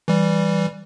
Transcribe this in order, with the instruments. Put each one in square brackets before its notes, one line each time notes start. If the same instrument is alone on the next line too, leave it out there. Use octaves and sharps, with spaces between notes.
[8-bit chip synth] E3 G3